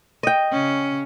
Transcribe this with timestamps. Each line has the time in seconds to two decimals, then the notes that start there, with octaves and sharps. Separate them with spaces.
0.23 D#5 G5
0.52 C#3 C#4